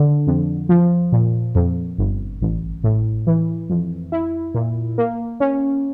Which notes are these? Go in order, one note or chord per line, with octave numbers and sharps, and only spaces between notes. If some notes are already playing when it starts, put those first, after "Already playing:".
Already playing: D3
F2
F3
A#2
F2
G1
A1
A2
E3
F2
E4
A#2
A#3
C#4